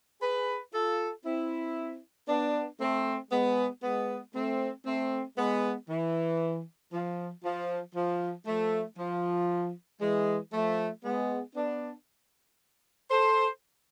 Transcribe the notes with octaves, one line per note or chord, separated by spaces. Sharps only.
G#4 B4
F4 A4
C4 E4
B3 D4
A3 C4
G#3 B3
G#3 B3
A3 C4
A3 C4
G#3 B3
E3
F3
F3
F3
F3 A3
F3
E3 G#3
F3 A3
G#3 B3
B3 D4
A4 C5